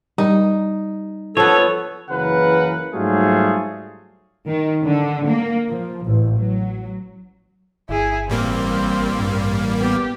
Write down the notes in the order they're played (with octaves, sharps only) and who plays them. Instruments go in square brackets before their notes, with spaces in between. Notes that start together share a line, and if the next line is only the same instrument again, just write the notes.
[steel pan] G3 [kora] D#4
[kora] F3 B3 [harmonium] A4 [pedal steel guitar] C#5
[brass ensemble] F#1 C#3 E3 A#4 B4 F#5
G#2 F#3 G3 A3 F4 G#4
[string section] D#3
D3
A#3
F3
A1
F#3
[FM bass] G1 [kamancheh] E4 G#4
[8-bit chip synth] A1 G3 A#3 [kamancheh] C4
[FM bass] G2
[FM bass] B3 [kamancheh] G4